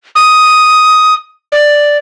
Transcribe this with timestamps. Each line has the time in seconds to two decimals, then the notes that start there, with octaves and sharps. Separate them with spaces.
0.15 D#6
1.52 D5